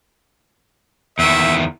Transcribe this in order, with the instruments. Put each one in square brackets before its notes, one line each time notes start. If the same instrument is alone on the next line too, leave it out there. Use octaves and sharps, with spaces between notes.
[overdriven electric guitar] E2 D#3 [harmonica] E5